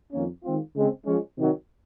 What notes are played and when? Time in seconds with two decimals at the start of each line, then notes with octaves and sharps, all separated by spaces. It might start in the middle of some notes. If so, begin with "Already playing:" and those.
0.13 F2 D#3 A#3 C#4
0.44 D#3 G#3 C4 F4
0.75 C#3 G#3 C4
1.06 F3 G#3 C#4
1.37 C3 D#3 F#3